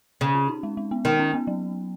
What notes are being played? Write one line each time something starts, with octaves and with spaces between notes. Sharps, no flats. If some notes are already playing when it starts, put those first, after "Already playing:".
C#3
C#4
D#4
G#3
G#3
B3
D#3 D#4
C#4
B3
F#3